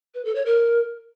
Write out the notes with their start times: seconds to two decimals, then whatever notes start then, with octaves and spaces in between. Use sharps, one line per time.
0.15 B4
0.25 A4
0.35 C#5
0.46 A#4